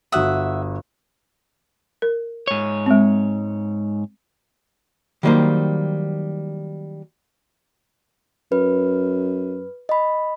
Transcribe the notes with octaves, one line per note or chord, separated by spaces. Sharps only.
G1 F#4 E5 F#5 D#6
A#4
G#2 C#5
G#3 C4
D#3 F#3 G3 A#3 D#4 C5
F#2 B4
D#5 B5